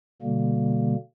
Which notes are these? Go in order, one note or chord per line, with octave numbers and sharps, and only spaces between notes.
B2 D3 G3 A#3